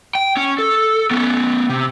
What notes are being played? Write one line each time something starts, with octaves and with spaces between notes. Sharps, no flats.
G5
C#4
A4
B3 C#4
C3